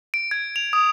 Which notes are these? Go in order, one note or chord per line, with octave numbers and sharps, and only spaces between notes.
D7
G#6
F7
D#6